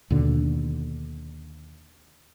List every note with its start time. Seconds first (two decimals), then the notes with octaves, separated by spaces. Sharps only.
0.10 D#2 B2 D3